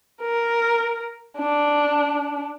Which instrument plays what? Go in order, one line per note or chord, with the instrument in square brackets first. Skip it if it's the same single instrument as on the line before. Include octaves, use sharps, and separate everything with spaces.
[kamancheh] A#4
D4